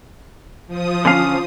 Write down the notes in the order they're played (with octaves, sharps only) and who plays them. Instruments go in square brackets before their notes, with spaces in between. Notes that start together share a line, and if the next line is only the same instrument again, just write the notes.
[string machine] F3 D#6
[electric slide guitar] D3 C#4 F5